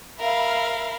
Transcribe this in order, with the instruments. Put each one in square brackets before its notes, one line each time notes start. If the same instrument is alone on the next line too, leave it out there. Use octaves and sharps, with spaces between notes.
[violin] A#4 [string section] E5 F5 B5